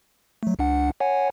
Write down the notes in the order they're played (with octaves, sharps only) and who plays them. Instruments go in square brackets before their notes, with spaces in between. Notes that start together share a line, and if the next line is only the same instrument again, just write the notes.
[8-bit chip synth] F#3 A3
C#2 D4 F#5
C#5 F#5 G#5